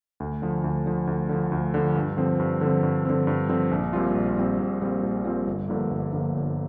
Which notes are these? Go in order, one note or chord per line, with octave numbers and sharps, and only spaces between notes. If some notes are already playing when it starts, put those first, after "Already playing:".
D2
D3 F3
D2
D3 F3
D2
D3 F3
D2
D3 F3
G2
D3 F3 C4
G2
D3 F3 C4
G2
D3 F3 C4
G2
D3 F3 C4
A#1
A#2 G3 C4 F4
A#1
A#2 G3 C4 F4
A#1
A#2 G3 C4 F4
A#1
A#2 G3 C4 F4
G1
G2 D3 F3 A#3
G1
G2 D3 F3 A#3
G1